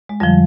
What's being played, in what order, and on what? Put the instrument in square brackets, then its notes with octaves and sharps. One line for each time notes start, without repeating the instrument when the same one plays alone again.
[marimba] G#3
F2 D3 F3 G3